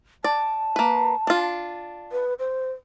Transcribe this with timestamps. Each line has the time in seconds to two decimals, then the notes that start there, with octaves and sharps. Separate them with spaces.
0.24 D5 A5
0.76 A#3 B4
1.27 D4 F4
2.12 B4
2.39 C5